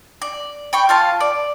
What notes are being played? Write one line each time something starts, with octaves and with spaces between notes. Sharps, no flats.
D5
G5 B5 C#6
F4 F5 A5
D5